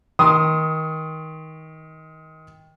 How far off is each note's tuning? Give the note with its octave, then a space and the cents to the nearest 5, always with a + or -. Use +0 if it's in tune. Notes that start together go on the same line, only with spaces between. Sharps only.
D#3 +25 C6 +0 D#6 +5